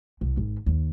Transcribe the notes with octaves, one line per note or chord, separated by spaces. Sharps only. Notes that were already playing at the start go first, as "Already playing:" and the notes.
C2
G#1
D#2